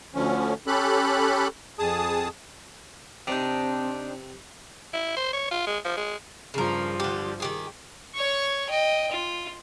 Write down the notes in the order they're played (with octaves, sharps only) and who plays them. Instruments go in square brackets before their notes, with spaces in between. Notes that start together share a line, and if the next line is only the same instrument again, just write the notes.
[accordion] D2 D3 F3 C#4
C#4 G4 A4 B5 F#6
F2 G#4 A5 D#6
[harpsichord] C3 [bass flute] C4 [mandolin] D4 D#4
[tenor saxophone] E4
C5
C#5
F4
G#3
F3
G#3
[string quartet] G2 F3 [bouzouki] C#3 A#4
[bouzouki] D3 G4
D#3 G4 G#4
[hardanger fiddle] C#5 C#6
D#5 G5
F4